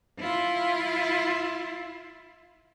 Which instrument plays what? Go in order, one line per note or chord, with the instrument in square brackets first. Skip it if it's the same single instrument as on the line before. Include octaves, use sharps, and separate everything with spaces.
[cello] E4 F4